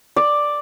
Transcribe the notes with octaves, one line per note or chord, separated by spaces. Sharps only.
D5